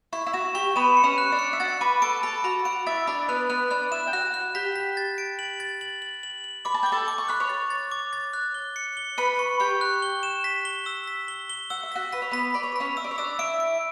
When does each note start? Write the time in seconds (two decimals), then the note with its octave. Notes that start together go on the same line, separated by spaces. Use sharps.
0.13 E4 C#6
0.26 E4
0.33 F#4 E7
0.55 G4 C#6
0.76 B3 B4 E7
0.97 C#7
1.04 C#4 C#5
1.18 F#6
1.32 D4 D5
1.39 C#7
1.53 E5
1.60 F#4 F#5 A6
1.81 B4 B5 D6
2.02 A4 A5 D7
2.23 A4 A5 B5
2.44 F#4 F#5 B5
2.65 F#4 F#5 D7
2.86 E4 E5 A6
3.07 D4 D5 B5
3.28 B3 B4 F#6
3.50 B3 B4 F#6
3.71 D4 D5 F#6
3.91 E4 E5 E7
4.07 G5
4.13 F#4 F#5 F#6
4.34 F#6
4.55 G4 G5 B6
4.76 B6
4.97 A6
5.18 D7
5.39 F#7
5.60 A6
5.81 F#7
6.02 F#7
6.23 F#7
6.44 F#7
6.65 B5 D6
6.74 A5
6.83 G5 D6
6.92 A4 A5
7.08 D6
7.18 C#6
7.28 B5 F#6
7.40 C#5 C#6
7.49 A6
7.70 A6
7.92 D6
8.13 A6
8.33 F#6
8.54 G7
8.76 C#7
8.97 G7
9.18 B4 B5 C#7
9.39 C#6
9.60 G4 G5 C#6
9.81 F#6
10.02 G7
10.23 E7
10.44 B6
10.65 G7
10.86 E6
11.07 B6
11.28 G7
11.50 G7
11.70 F#5 E6
11.83 E5
11.92 F#4 F#5 B6
12.12 B4 B6
12.22 C#5
12.31 B3 B4 B6
12.54 D5 B5
12.63 C#5
12.72 B4
12.76 C#4 C#5 B6
12.97 E5 E6
13.04 D5
13.11 C#5
13.18 D4 D5 E6
13.39 E4 E5 D7
13.60 D7